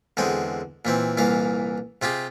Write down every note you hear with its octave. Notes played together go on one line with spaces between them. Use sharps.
E2 D3 G#3 C4 D#6
A#2 E3 C4
C2 A#2 E3 F5
C3 F4 G4 G#4